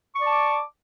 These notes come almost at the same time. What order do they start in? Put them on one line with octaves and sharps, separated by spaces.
C#6 D5 A5 D6